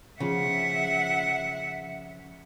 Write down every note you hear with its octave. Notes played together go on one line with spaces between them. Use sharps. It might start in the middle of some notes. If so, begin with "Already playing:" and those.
C#3 F3 E5 F#5